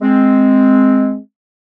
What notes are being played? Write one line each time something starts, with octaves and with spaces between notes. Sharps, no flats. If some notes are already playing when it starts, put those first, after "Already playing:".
G#3 C4